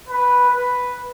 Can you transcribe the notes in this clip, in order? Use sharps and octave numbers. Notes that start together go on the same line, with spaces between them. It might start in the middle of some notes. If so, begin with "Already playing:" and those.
B4
B4